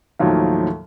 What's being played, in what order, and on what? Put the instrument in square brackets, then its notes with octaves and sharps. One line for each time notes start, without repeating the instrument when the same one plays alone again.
[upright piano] D#2 A2 D#3 F3 F#3 F5